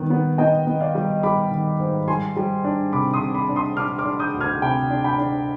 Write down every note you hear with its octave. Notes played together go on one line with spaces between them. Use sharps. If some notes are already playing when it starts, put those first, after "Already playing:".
Already playing: D#3 G3 B3
B3
B3 D#5 G5
B3
D5 F5
G3
G3 B5 D6
D#3
G#2
G3 G#5 C6
G3
D4
C3 B5 D6
C6 D#6
C3
B5 D6
D4
C6 D#6
D4 D6 F6
D6 F6
D4
D#6 G6
D2
F6 G#6
C3 G5 B5
D4
G5 B5
D4